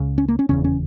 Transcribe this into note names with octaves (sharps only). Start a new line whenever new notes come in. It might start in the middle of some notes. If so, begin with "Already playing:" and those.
Already playing: C#2 C#3
C#4
A#3
C#4
F1 E2 C#3 C#4
C#4